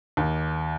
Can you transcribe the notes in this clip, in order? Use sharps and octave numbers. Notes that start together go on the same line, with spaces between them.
D#2